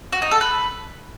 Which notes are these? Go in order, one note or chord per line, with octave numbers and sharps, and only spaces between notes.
F#4
D#4
A4
B4